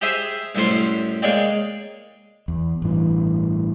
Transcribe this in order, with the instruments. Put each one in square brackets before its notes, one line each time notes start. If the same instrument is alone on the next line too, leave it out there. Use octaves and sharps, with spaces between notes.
[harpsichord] G4 G#4 C5 E5 G#5
C2 F#2 A2 C#4 C5 C6
G#3 A#3 G#4 C#5 D5 G5
[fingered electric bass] E2
A1 G2 E3